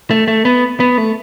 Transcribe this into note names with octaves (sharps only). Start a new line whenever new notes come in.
A3
A3
B3
B3
A3